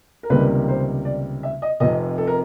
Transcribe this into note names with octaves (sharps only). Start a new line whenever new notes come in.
A#4
C#2 C3 D#3 G3 A#3 B4
C5
D5
E5
D#5
F1 F2 C3 D#5
A4
A#4